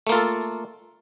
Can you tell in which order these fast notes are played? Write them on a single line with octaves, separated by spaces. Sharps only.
A3 A#3 F4 A4